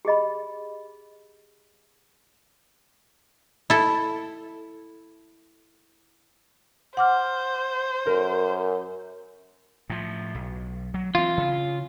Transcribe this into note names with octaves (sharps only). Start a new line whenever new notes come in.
G4 G#4 D#5 B5
E4 A4
C5 F#5 D6 F6
F#2 A#4
A2 F3
B1
F#3
E3 C4 F4
C#3